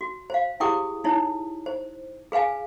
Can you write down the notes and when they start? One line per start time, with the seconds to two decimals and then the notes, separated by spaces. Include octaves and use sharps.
0.01 F#4
0.30 C5 F5
0.60 E4 G4 G#4 G5 D6 D#6
1.04 D#4 E4 C#5
1.66 C5
2.32 G#4 B4 F5 G#5